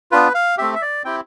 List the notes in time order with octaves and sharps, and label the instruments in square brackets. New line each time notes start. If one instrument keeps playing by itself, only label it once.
[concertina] B3 D4 F4 B4
F5
A3 C4 G4 E5
E5
D5
C4 E4 G4 G5